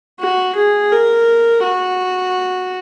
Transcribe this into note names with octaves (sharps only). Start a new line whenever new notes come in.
F#4
G#4
A#4
F#4